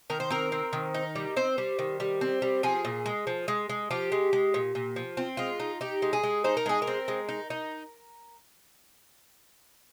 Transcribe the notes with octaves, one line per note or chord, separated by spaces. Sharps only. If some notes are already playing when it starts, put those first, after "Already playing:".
D#3 A#4
C5
C4 A#4
C4
D#3
D#4
G3
C4 C5
G3
D#3
G3
C4
G3
F3 G#4
A#2
G#3
F3
G#3
G#3
F3 G4
G#3
G#3
A#2
A#2
F3
C4 F4
G#3 F4
D#4
D#4 G4
G#3
G#4
G#3
D#4 C5
A#4
G#3 G#4
A#4
C4
G#3
D#4
D#4